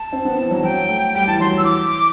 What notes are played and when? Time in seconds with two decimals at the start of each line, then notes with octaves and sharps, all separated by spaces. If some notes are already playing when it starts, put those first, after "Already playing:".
Already playing: A5
0.12 C4
0.25 B3
0.38 E3
0.51 F#3
0.63 F#3 G5
0.89 A3
1.15 G3 G5
1.27 E3 A5
1.40 F#3 C6
1.52 E3 E6
1.65 D6